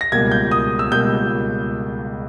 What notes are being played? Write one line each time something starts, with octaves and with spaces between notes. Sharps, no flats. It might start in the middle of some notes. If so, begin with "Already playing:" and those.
A#6
C#2 B2 G3 A#3 G#6
G6
D#6
E6
C#2 B2 G3 A#3 G6